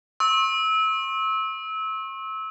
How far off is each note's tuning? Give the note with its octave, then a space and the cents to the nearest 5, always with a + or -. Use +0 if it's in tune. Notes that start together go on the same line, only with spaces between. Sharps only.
C#6 -45 E6 -25